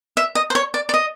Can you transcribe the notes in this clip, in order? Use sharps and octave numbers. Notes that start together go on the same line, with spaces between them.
E5
D#5
C5
C#5
D5
D5
D#5